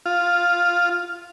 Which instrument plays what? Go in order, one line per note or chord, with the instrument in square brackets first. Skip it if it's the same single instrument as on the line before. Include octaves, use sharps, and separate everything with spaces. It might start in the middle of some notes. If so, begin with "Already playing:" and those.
[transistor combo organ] F4